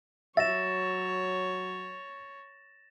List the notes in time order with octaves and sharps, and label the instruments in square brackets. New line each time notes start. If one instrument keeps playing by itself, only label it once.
[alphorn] F#3 [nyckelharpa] C#5 [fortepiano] E5 [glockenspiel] A6 A#6 E7